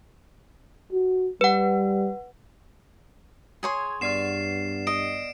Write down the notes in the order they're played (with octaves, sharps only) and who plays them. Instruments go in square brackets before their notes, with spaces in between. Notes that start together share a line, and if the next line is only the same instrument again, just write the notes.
[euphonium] F#4
[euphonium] G3 [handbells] B4 F#5
[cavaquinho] G#4 C#5 C6 [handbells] G#6
[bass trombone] G2 [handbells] B3 D5 F6 [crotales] C7 E7
[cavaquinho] D#5 [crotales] D7